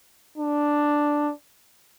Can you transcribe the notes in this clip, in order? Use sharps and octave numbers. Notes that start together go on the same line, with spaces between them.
D4